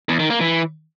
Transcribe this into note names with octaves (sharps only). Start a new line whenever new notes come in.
E2
D#3
A#3
E3